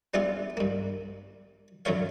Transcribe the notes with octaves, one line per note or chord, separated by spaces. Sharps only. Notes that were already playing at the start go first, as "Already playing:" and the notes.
G3 B3 D4 E4 F4 G#4
G2 A#3
F#2 D3 F#3 A#4 C#5 F5